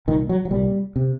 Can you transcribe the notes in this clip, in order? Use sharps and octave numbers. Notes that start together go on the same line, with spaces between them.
C2 A#2 D#3
F#3
F#3
C2 A#2 G3
C3